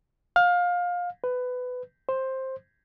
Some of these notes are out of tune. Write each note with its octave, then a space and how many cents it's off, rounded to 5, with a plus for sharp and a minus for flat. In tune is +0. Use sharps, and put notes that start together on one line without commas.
F5 +25
B4 +20
C5 +10